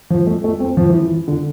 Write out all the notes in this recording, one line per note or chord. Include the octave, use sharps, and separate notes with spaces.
F3
A3
A3
C4
F3
E3
E3
D3